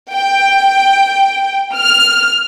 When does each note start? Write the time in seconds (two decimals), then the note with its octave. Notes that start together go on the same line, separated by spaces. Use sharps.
0.12 G5
1.76 F6